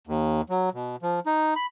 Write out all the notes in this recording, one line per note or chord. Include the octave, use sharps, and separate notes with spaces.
D#2
F#3
B2
F3
D#4
B5